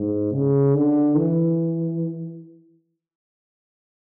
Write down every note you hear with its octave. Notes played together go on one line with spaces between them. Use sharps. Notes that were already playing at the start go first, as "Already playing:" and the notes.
Already playing: G#2
C#3
D3
E3